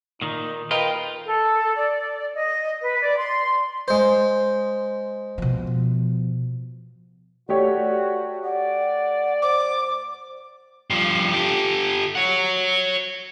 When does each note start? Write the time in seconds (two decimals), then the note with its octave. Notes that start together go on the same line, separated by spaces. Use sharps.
0.22 A#2 D#3 D#4
0.71 F4 A#4 B4 D#5 G5
1.26 A4
1.75 D5
2.33 D#5
2.81 B4
3.00 D5
3.18 C6
3.88 G#3 C5
5.38 B2 F3
7.49 A3 F#4 G4 C#5 D5
8.44 D5 F#5
9.42 C5 D6
10.90 G2 F3
11.33 G4 A4
12.15 C#5 F#5